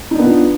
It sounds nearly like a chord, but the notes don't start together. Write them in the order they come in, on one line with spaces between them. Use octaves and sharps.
D#4 D4 B3 F4